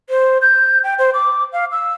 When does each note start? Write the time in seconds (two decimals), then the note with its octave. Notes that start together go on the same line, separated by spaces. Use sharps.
0.10 C5
0.42 G6
0.84 G5
0.99 C5
1.14 D6
1.53 F5
1.72 E6